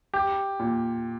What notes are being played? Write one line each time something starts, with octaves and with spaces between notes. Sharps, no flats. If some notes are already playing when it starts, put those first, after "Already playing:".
G4
A#2